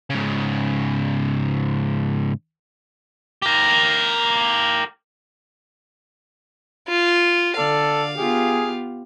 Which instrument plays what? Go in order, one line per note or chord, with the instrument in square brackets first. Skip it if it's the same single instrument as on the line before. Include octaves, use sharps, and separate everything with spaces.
[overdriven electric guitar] G#2 C#3
[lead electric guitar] G4 A#4
[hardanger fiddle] F4
[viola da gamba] D3 D5 [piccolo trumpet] A4 [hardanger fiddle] F5
[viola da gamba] B3 F4 G4 [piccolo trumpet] G#4